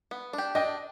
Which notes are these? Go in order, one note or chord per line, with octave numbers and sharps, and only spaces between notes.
B3
D4 G4
D4 D#5 G5